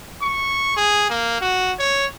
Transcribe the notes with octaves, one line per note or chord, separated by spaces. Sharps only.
C#6
G#4
A#3
F#4
C#5